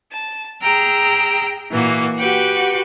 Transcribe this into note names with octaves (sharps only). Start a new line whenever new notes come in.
A5
G#4 G5 A#5 E6 F6
A#2 E3 A#3 F#4
F#4 G4 B4 G5